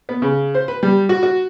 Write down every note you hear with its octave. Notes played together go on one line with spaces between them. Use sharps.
B3
C#3
C5
B4
G3
F#4
F#4